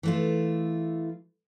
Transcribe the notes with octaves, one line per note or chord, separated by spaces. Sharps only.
E3 A3 F4